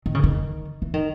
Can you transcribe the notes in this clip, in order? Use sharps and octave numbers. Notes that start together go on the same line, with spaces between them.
D#3
C#3
D#3
E3
D#3